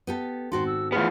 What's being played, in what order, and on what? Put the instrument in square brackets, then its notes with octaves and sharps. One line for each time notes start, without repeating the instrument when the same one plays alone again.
[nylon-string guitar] B3 G4 A4
[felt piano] G#1 [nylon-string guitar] C4 F#4 A4 [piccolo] C6
[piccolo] E6
[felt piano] E3 A3 G#4 [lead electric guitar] F3 B3 [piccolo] F6